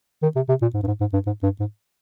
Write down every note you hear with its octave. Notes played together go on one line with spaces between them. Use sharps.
D#3
C3
C3
A#2
G#2
G2
G#2
G#2
G2
G#2
G2
G#2